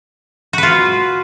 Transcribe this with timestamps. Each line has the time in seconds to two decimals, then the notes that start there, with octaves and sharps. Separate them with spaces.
0.53 F#4
0.58 B4
0.63 F4